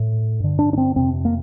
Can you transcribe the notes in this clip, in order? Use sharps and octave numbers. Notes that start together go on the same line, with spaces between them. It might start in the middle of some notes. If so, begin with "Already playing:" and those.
Already playing: A2
G2 D3
D4
D4
C4
F2 C3 C4
A#3